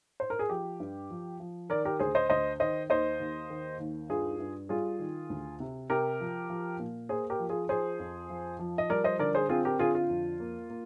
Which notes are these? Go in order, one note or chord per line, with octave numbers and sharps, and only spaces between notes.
C5
A#4
G#4
F3 G4
G2
F3
F3
D#3 A#4 D5
G4 A#4
D2 G#4 C5
C5 D#5
D2 C5 D#5
D#3 C5 D#5
D#2 C5 D#5
D#2
D#3
D#2
G2 F4 G#4
G2
G3 F4 G#4
D#3
D2
C3
C3 G4 A#4
F3
F3
A#2
A#3 G#4 C5
G4 A#4
F3
F4 G#4
F3 G#4 C5
F2
F3
F3
D#5
G3 A#4 D5
C5 D#5
D3 A#4 D5
G#4 C5
C4 F4 G#4
G4 A#4
D3 F4 G#4
F4
F2
A#3
A#3